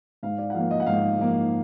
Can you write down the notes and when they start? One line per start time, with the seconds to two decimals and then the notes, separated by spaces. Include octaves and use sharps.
0.23 G#2 F5
0.38 D5
0.50 F#5
0.54 F3 A#3 F5
0.71 D#5
0.80 F#5
0.86 G#2 F5
1.19 F3 A#3